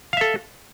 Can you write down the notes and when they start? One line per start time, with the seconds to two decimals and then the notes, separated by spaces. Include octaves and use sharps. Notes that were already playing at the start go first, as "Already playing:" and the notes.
0.13 F5
0.17 E5
0.21 A4